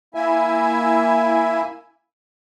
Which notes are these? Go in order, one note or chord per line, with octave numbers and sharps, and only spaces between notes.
A#3 E4 E5 G#5